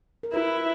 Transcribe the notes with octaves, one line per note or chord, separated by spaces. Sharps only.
A#4
E4 B4